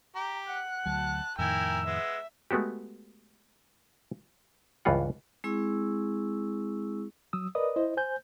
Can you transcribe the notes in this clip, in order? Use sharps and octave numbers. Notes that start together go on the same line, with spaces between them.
G4 A#5
F#5 F#6
D2 F#3 A5
F2 A2 D#3 E4 A#4 G5 G#5 E6
G#3 B3 E5
G#3 A3 B3 F#4 G4
C#2 G2 E3 F4 F#5
G#3 C4 E4 G#4 C#6 E6
F#3 D#6 E6
A#4 B4 D5 D#5 D#6
E4 C5 D#5
C5 G#5 G6